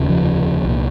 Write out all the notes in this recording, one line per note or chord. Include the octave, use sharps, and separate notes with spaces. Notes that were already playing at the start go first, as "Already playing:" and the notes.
Already playing: F1 D#2 C#3
F3
C2 A#2